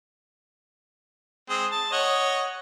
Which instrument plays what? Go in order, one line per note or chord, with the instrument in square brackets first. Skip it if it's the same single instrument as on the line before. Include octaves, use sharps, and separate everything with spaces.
[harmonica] G#3 C4 D#6
A5
C#5 D#5 F#5